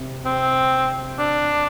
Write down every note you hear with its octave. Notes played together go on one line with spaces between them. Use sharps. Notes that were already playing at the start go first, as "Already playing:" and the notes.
Already playing: C3
C4
D4